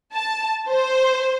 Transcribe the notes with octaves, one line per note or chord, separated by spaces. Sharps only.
A5
C5